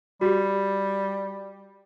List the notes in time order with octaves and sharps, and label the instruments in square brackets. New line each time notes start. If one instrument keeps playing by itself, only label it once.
[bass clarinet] G3 [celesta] F#4 G4